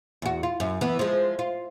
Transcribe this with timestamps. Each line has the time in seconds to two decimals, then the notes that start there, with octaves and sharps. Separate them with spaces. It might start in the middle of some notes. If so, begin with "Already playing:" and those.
0.22 E2 F#4
0.43 F4
0.60 F#2
0.81 E3 B3
0.99 F3 G#3
1.39 F4